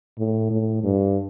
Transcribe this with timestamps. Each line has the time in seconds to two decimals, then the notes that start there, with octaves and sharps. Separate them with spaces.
0.18 A2
0.51 A2
0.83 G2